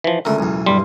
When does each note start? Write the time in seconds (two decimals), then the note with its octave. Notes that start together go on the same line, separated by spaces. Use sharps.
0.04 E3 F3
0.25 C#2 D3 A3 A#4
0.39 B1 E2
0.66 G2 G3 C6